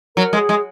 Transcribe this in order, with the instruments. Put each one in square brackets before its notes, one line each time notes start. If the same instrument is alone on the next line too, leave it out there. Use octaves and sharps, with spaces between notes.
[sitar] F#3 [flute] A#4
[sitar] G#3
[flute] G#4
[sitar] G#3